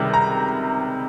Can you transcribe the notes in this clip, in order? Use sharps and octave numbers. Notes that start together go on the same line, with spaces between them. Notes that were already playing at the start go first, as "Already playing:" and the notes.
Already playing: C#2 C3 D#3 G3
A#5